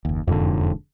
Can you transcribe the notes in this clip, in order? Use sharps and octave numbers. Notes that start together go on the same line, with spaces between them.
F#1 D#2
E1 F2 G#2 D3